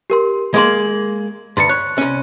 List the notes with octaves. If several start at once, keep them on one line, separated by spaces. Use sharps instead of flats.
G4 A#4 C6
G#3 A#3 C6 G#6 F#7
D2 G2 C6 A6 C#7
C#5 F#6
C2 C#4